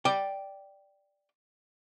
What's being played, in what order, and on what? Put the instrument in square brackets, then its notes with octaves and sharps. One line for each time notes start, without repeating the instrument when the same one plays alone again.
[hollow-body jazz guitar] D5 G5